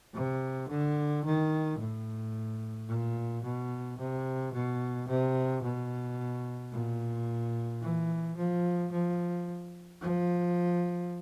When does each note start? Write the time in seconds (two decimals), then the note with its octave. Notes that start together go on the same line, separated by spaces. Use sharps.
0.14 C3
0.68 D3
1.24 D#3
1.79 A2
2.88 A#2
3.44 B2
3.99 C3
4.52 B2
5.08 C3
5.62 B2
6.72 A#2
7.82 E3
8.37 F3
8.92 F3
10.01 F3